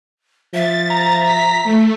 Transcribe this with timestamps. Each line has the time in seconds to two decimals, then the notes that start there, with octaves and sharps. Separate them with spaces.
0.54 F3 E5 A6
0.90 A#5
1.24 B6
1.64 A3